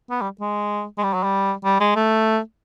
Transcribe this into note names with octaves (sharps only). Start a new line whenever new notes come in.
B3
G3
G#3
G#3
G3
F#3
G3
G3
G#3
A3